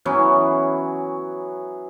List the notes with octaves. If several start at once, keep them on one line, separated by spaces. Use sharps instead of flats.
E3 F#3 B3 C#4